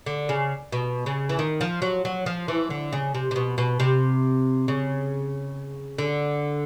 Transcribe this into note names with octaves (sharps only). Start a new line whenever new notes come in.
D3
C#3
B2
C#3
E3
D#3
F3
F#3
F#3
F3
E3
D3
C#3
C3
C3
B2
B2
C3
C#3
D3